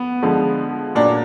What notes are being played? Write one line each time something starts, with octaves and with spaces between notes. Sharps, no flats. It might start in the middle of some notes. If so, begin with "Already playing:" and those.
Already playing: B3
D3 F3 G#3
A#2 F#3 D4